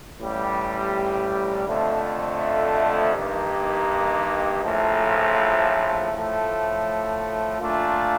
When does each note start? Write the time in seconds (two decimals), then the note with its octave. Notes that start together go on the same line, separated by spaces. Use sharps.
0.18 A1 A2 G3
1.66 F2 D3 F3 A3
3.14 G2 D#3 A#3 D#4 G4
4.63 A#1 A2 F3 A3
6.11 A2 F3 A3
7.59 A#2 A3 D4 F4